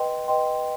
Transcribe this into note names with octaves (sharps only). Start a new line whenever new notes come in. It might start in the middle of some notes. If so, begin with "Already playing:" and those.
Already playing: B4 D#5 G5 C6
B4 D#5 G5 C6